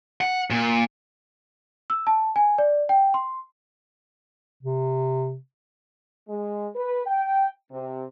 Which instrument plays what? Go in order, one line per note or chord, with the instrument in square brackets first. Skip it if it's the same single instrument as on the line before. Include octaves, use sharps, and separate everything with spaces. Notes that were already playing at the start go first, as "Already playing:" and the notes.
[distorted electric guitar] F#5
A#2
[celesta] E6
A5
G#5
D5
G5
C6
[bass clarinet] C3
[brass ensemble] G#3
B4
G5
C3